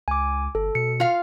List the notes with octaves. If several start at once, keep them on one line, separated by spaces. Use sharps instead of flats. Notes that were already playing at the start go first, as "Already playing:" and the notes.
C#2 G#5 D6
G1 A4
B2 C#7
F4 F5